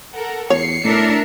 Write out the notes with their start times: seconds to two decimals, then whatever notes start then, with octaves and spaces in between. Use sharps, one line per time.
0.14 A4 A#4 F#5
0.50 E2 C#5 C7 C#7
0.85 A2 D4 A#4 E5